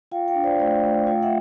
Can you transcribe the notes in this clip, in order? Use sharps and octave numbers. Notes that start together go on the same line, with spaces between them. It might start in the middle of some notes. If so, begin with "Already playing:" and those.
F4 F5 G5
F5 G5
D4
C5 D5
A3 C5 D5
A3
F4 F5 G5
E5 F#5